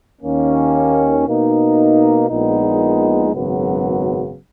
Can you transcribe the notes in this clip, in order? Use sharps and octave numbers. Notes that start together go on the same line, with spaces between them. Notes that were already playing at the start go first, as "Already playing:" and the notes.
D#2 D#3 A#3 C#4
B2 A#3 D#4
A#1 A#2 G#3 B3 D#4
G#1 F#2 C#3 F#3 B3